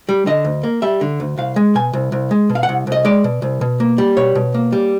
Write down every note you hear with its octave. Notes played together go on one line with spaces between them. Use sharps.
G3
D3 D#5
D2
A#3
G3 E5
D3
D2
C2 F5
G#3
B2 G#5
C2
C2
G#3
B2
F5
F#5
C2
C2 D#5
G#3 D5
B2
C2
B2
A#3
G3
B2 C#5
B2
A#3
G3